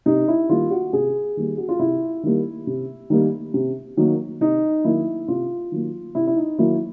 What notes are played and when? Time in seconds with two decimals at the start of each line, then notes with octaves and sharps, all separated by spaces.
0.06 C3 D#4
0.28 E4
0.49 D#3 G3 A#3 F4
0.71 F#4
0.93 C3 G#4
1.37 D#3 G3 A#3
1.57 F#4
1.69 F4
1.79 C3 E4
2.23 D#3 G3 A#3
2.67 C3
3.10 D#3 G3 A#3
3.54 C3
3.97 D#3 F#3 A#3
4.41 C3 D#4
4.84 D#3 F#3 A#3 E4
5.28 C3 F4
5.72 D#3 F#3 A#3
6.15 C3 E4
6.27 E4
6.36 D#4
6.58 D#3 F#3 A#3 E4